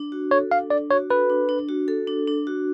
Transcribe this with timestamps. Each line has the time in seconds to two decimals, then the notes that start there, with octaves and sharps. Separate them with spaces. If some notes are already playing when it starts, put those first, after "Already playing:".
Already playing: D4
0.12 F#4
0.31 A4 C#5
0.51 D4 F5
0.70 D4 D5
0.90 F#4 C#5
1.10 A4 B4
1.30 D4
1.49 D4
1.69 F#4
1.88 A4
2.07 D4
2.27 D4
2.47 F#4